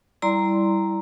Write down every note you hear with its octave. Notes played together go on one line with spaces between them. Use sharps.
G3 E4 D5 A#5 C6